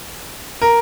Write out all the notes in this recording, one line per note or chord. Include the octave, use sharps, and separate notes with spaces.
A#4